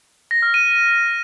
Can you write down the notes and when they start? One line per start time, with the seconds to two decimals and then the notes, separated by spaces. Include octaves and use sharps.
0.31 A#6
0.42 F6
0.54 D#7